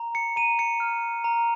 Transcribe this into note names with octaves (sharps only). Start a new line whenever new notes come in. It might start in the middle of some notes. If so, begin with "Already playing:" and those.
Already playing: A#5
C#7
A#5 D#7
C#7
F6
A#5